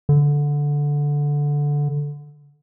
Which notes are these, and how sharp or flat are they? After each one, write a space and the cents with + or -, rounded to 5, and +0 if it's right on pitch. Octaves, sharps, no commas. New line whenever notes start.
D3 -10